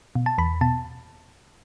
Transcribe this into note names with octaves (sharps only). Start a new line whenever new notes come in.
B2
A5
E2 B5
B2 A5